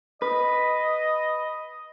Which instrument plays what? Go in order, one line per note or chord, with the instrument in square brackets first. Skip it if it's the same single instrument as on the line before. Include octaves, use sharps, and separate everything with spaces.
[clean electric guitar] B4 [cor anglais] D#5